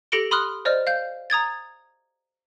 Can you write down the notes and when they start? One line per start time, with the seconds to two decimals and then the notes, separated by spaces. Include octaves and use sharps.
0.12 G4 A4 A#6 C#7 D7 G7
0.31 B5 C6 D#6 F6 F#6
0.65 C5 D5 D#5 F6
0.87 F5 G6
1.30 A#5 D#6 G#6 A6